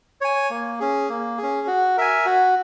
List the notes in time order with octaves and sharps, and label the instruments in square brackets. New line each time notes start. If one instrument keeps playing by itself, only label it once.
[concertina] C#5 G#5
A#3
C#4 G#4
A#3
G#4
C#4
F#4
A#4 E5 G#5
F#4